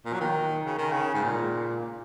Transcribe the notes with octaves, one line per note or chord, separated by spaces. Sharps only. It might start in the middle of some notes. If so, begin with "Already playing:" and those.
A#2
F#3
D#3
C#3
D#3
C#3
G#2
A#2